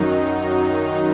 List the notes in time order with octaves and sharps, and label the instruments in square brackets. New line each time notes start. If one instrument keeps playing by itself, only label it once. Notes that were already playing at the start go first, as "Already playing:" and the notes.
Already playing: [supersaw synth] F#2 D#3 F#3 D#4